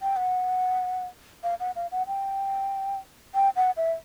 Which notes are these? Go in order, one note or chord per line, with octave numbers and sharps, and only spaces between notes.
G5
F#5
F5
F#5
F5
F#5
G5
G5
F#5
E5